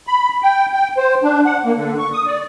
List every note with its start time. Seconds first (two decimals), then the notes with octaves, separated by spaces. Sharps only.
0.07 B5
0.43 G5
0.74 G5
0.97 C5
1.23 D4
1.45 F#5
1.65 A#3
1.77 D3
1.99 C#6
2.13 D#6
2.26 D5